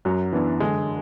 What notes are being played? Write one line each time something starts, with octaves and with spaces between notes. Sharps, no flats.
F#2 F#3
E3 B3 D4
D3 G#3